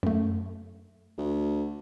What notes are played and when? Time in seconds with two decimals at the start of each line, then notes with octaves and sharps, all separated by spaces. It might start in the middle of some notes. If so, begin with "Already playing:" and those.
0.03 F#2 A3
1.18 D2